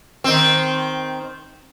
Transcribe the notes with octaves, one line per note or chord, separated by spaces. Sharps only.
D#3 C4